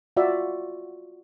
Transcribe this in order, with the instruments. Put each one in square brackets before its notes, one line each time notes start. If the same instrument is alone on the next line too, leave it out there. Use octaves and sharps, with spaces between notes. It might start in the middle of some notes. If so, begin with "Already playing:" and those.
[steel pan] F4 F#4 D5 E5